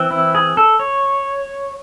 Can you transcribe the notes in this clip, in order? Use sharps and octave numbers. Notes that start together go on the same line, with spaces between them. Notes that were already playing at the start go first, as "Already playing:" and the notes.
Already playing: E3 C4
E4
G#4
A4
C#5